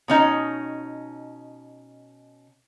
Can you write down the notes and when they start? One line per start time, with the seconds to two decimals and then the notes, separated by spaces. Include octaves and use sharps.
0.08 B2 C#4 D#4